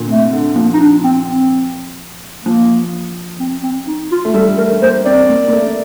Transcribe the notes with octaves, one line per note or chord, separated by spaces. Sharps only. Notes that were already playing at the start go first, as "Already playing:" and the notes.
Already playing: A#2 D3
C3 A3
D3
F3 A#3
D#4
D4
C4
C4
F3 A#3
C4
C4
D#4
F4
A3
G3 A4
A3 A#4
A#3 C5
C4 D5
A#3
A#3
A3